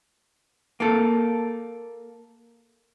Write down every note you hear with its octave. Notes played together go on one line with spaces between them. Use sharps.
A#3 A4